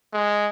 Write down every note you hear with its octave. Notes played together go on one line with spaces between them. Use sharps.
G#3